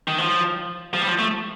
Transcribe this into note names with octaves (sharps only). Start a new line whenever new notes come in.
D#3
F3
F3
G3
F3
A3